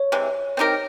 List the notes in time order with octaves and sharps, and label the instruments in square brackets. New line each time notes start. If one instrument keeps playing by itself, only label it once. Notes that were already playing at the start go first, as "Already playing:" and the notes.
Already playing: [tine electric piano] C#5
[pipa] C3 E3 G#3
C4 D#4 G4 A#4